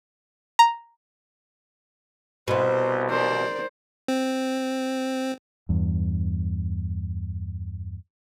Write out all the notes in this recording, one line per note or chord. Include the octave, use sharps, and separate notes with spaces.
A#5
C2 B2 B3 C5
A#4 C5 D5
C4
E2 G2